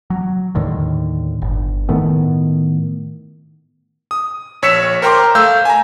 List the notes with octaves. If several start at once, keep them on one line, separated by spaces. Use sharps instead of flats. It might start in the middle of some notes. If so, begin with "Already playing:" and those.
F#3
D#2 A2 D3 D#3
G1
A2 D#3 A3 B3
D#6
A#1 C#5 E6 B6 C#7 E7
A#4 C5 G5 A#5 C6 D6
A3 F5 E6 G6
G#5 A#5